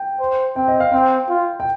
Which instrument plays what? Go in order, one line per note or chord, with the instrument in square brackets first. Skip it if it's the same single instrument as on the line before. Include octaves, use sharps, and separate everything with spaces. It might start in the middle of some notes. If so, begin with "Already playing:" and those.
Already playing: [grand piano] G5
[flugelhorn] C5
[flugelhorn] C4 [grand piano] G5
[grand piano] D#5
F5
[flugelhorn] C4 [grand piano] G5
[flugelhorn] F4
[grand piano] G5